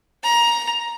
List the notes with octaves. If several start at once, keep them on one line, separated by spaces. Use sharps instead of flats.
A#5